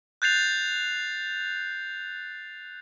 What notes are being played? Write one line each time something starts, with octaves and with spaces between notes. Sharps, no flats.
F#6 G6 A6 C7 F7